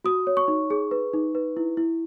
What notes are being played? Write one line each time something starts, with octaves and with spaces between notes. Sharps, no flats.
F#4 D#6
C#5
C#6
D#4
G#4
B4
D#4
B4
E4
E4